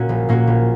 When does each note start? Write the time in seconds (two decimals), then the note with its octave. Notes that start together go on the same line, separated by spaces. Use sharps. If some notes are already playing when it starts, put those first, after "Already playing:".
Already playing: A#2 A#3 C#4 F#4
0.09 A#1
0.29 A#2 A#3 C#4 F#4
0.47 A#1